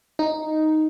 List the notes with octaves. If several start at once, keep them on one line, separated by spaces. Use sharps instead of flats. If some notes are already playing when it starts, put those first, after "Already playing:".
D#4